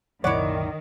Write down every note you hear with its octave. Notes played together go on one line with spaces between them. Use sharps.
C2 F#2 A#2 D#3 E4 C#5 D5 F#5